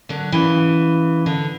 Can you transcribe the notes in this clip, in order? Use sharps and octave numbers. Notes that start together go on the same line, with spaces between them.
D3 F#3
C#3 E3
D3